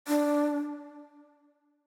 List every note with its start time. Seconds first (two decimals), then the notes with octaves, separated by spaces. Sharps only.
0.08 D4